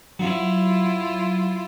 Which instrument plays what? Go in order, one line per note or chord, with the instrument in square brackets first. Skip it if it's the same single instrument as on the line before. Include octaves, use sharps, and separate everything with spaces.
[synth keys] F#3 [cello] E4 F4